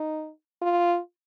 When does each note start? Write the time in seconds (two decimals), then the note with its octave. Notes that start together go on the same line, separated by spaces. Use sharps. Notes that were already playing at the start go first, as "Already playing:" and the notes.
Already playing: D#4
0.62 F4